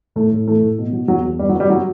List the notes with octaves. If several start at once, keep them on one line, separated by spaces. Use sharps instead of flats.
A2 A3
A2
E3 A3
A2
B2
F#3
E2 F#3
E2
G2 G3
F#3
G2
G3
F#3